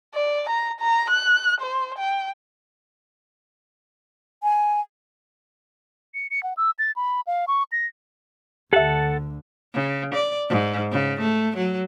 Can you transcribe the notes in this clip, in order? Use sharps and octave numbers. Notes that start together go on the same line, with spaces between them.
D5
A#5
A#5
F#6
C5
G5
G#5
C#7
C#7
F#5
E6
A6
B5
F5
C#6
A#6
D2 D3 G4 A4 E5 F#5 A5
C#3
D5
G#2
C#3
A3
F#3